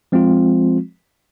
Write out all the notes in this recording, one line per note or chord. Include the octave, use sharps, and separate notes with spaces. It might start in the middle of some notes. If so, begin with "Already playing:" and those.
F3 G#3 C4 F4